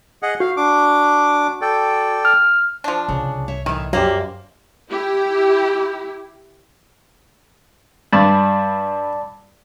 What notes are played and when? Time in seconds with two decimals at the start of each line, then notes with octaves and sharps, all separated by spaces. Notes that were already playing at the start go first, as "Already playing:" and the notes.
0.23 G#4 D#5 F#5
0.40 F#4 F5
0.57 D4 D6
1.62 A4 D5 G5
2.25 F6
2.84 F3 D4
3.08 C2 C#3
3.48 C#5 E5
3.66 A2 D#3 E3
3.93 F#2 F#3 A#3 G4 C5 D5
4.90 E4 G4
8.13 G2 D5 A5 B5